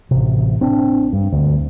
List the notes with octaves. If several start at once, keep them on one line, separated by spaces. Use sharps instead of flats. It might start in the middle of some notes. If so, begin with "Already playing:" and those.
A1 C3
C4 D4
G2
D2